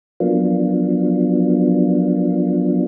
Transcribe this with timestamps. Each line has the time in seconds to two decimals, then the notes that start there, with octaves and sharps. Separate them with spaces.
0.20 F3 F#3 A#3 B3 D4 F4